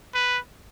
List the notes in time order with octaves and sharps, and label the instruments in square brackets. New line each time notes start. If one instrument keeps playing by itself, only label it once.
[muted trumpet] B4